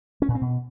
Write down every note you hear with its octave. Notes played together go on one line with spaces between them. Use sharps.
C#4
A#2
C4
B2